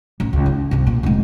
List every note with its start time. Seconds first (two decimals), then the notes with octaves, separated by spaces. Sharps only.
0.20 A1
0.33 C#2
0.46 E4
0.71 C2 G2
0.87 A#2
1.03 F1 G#3